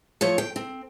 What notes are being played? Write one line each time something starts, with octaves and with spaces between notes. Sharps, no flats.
F3 A3 C#5
G5
C4